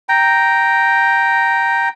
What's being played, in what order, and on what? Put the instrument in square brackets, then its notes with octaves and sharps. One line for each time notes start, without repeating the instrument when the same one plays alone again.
[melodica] G5 A#5